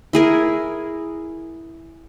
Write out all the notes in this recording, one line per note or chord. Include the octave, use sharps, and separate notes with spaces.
E4 G#4 A#4